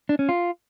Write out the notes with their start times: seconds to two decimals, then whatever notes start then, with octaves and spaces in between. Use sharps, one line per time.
0.09 D4
0.19 C#4
0.29 F4